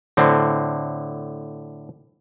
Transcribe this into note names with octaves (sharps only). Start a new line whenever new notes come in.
A2 D3 C4